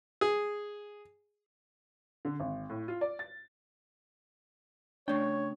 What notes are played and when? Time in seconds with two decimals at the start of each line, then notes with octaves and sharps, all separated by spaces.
0.21 G#4
2.25 D3
2.40 G#1
2.70 A2
2.88 F4
3.01 D5
3.19 A6
5.08 C#3 A3 D4 C#5 G5